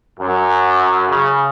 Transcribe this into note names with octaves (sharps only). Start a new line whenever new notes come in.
F#2
C#3